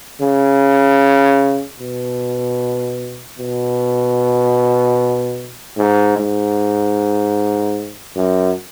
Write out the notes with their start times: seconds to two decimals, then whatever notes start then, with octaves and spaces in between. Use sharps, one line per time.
0.21 C#3
1.80 B2
3.39 B2
5.77 G#2
6.17 G#2
8.16 F#2